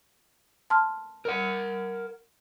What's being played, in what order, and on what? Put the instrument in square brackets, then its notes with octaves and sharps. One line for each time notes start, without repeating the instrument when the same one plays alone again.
[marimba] A5 C6 F6
[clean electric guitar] A#4 F#5